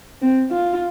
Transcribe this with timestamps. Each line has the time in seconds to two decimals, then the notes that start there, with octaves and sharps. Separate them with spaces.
0.22 C4
0.51 F4